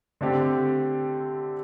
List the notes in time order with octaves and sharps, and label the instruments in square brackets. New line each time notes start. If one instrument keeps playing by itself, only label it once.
[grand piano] D3 A3 C4 G4